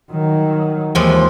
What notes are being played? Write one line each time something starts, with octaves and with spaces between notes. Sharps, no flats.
D#3 F#3
D#2 E3 F3 G#3